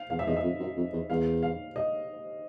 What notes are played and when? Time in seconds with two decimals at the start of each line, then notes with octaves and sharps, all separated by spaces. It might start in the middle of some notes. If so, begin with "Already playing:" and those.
Already playing: F5
0.10 E2 F5
0.19 E5
0.27 E2 D#5
0.36 E5
0.43 F2
0.60 F#2
0.77 F2
0.93 E2
1.10 E2 F5
1.43 F5
1.76 D#5